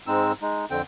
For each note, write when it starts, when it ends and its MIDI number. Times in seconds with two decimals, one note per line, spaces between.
0.07 0.32 44
0.07 0.32 56
0.07 0.32 60
0.07 0.32 63
0.07 0.32 88
0.42 0.65 56
0.42 0.65 63
0.70 0.82 41
0.70 0.82 50
0.70 0.82 60
0.70 0.82 79